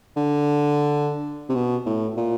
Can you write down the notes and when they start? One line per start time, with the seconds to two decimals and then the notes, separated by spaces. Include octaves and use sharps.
0.16 D3
1.49 C3
1.55 B2
1.86 A2
2.17 A#2